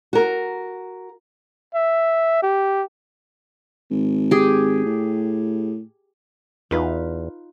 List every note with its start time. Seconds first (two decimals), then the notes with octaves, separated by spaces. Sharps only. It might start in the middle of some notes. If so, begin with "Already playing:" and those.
0.13 F#4 A#4
1.74 E5
2.43 G4
3.90 G#1
4.31 G4 G#4
4.85 A2
6.71 E2 D#4 F4 B4